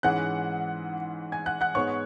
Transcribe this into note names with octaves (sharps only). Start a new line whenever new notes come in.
G#2 E3 G#3 C#4 F#5 F#6
G#5 G#6
F#5 F#6
F#5 F#6
G#2 G#3 B3 C#5 C#6